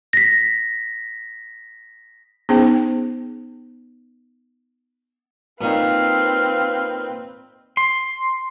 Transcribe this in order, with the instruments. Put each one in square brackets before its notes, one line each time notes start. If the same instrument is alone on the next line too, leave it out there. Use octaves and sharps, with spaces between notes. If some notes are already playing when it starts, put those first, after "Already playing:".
[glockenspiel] A#6 B6
[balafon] B3 C#4 D#4 G#4 C5 G5
[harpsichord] A#2 D#3 [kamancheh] C4 B4 [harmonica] F5
[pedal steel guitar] C6